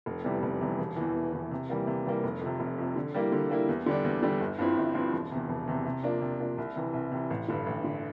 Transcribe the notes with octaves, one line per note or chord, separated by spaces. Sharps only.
F1
E2 C3 E3 G3
F1
E2 C3 E3 G3
E1
E2 E3
E1
E2 E3
C3
E3 G3 A#3
C3
E3 G3 A#3
F1
F2 C3
F1
F2 C3
D3
G3 A#3 E4
D3
G3 A#3 E4
E2
D3 G3 D4
E2
D3 G3 D4
G1
G2 F3 C4 E4
G1
G2 F3 C4 E4
E1
E2 C3
E1
E2 C3
C3
F3 A#3 D4
C3
F3 A#3 D4
C2
C3 E3
C2
C3 E3
A1
G2 D3
A1
D3